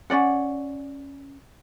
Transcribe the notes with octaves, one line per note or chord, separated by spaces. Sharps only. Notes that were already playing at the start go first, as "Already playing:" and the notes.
C#4 D#4 D5 F#5